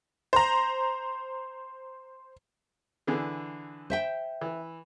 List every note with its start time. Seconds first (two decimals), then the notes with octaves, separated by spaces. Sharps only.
0.33 C5 A#5
3.07 D3 E3 G#4
3.90 C5 E5 G5
4.41 E3